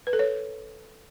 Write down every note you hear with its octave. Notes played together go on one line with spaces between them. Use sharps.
B4
A4
C#5